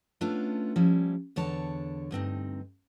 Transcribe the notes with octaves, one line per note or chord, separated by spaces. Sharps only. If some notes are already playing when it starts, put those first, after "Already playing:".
A3 B3 C#4 D4 F4
F3 G3 C#4 E4
E2 D3 C#5 A5
D2 G2 C4 D#4